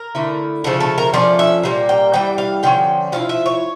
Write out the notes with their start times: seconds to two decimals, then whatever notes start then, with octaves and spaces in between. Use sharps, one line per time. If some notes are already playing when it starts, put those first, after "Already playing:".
Already playing: A#4
0.15 D3 A3 E4
0.64 C#3 F3 A3 A4
0.80 A4
0.98 A#4
1.14 F3 A3 C#4 D5
1.39 E5
1.63 A#2 G3 A#3
1.89 G5
2.14 E3 G3 G5
2.38 F5
2.63 D3 F3 C#4 G5
3.12 F3 C#4 E4 F5
3.29 E5
3.46 C#5